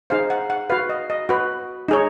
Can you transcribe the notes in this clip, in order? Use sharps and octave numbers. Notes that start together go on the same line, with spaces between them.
D#4 G#4 C5 F5
F#5
F#5
F#4 B4 F5
D#5
D#5
F#4 B4
D#4 G#4 C#5